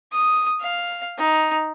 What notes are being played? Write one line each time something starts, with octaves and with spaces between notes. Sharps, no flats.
D#6
F5
D#4